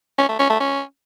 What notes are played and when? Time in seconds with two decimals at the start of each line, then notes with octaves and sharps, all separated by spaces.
0.18 C#4
0.29 A3
0.39 C#4
0.50 A3
0.60 C#4